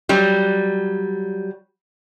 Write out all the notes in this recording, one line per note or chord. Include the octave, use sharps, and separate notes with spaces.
F#3 G3